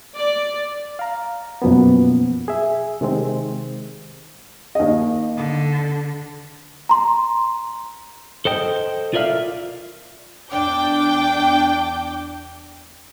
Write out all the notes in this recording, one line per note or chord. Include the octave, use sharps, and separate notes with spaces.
D5
F5 A#5
F#2 B2 F3 A#3 B3
G#4 E5
C3 D#3 G#3 C4
D#2 D#5
D3
A#5 C6
A4 C5 D#5 G5
F4 A#4 D5 E5 F5
E2 D4 G5 D6 G6